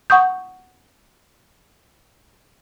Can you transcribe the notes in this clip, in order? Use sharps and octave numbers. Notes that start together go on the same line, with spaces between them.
F#5 C#6 D#6 G6